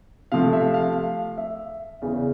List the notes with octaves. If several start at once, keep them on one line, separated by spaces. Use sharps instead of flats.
C3 F3 A3 F5
E5
F5
E5
E2 C#3 E3